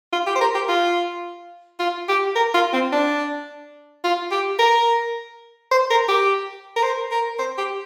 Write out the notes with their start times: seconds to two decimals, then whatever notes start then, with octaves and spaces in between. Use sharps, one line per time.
0.12 F4
0.27 G4
0.35 C5
0.41 A#4
0.54 G4
0.68 F4
1.79 F4
2.08 G4
2.36 A#4
2.54 F4
2.73 C4
2.92 D4
4.04 F4
4.31 G4
4.59 A#4
5.71 C5
5.90 A#4
6.08 G4
6.76 A#4
6.83 C5
7.11 A#4
7.39 C5
7.58 G4